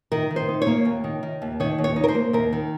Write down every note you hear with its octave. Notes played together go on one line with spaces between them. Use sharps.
D#3 A#4
D#3
C5
D#4
C#5
A#3
D#2
D#3
D#3
D#2
D#3 C#5
D#2
C#5
D#4
A#4
C5
A#3
D#2 A#4
D#3